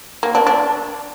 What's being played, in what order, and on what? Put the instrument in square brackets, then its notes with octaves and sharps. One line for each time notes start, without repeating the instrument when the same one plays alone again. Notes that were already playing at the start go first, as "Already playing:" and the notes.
[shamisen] A#3
D4
D4